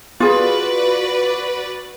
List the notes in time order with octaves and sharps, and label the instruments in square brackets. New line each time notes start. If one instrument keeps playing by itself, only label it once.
[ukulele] F4 G#4 [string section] F#4 B4 D5